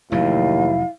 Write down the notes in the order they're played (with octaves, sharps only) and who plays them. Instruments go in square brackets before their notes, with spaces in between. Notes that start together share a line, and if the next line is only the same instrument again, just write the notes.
[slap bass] F1 A2 F#3 [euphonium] D#2 [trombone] E4 [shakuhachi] F5